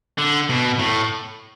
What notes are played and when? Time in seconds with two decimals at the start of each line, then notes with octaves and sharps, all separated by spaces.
0.18 D3
0.50 B2
0.79 A2